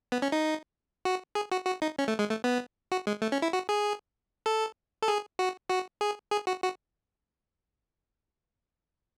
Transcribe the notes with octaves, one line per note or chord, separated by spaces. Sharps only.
B3
C#4
D#4
F#4
G#4
F#4
F#4
D#4
C#4
A3
G#3
A3
B3
F#4
G#3
A3
C#4
E4
F#4
G#4
A4
A4
G#4
F#4
F#4
G#4
G#4
F#4
F#4